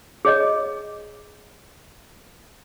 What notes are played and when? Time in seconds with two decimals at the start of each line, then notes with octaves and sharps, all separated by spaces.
0.25 G#4 C#5 D#5